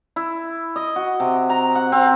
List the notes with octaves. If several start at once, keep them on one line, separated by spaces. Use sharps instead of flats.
E4
D#5
F#4
C3
A#5
F#5
C4